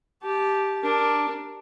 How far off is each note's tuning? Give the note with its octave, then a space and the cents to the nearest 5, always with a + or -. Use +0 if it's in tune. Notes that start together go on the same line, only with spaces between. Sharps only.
G4 +0 A5 -20
D4 +0 A#4 +0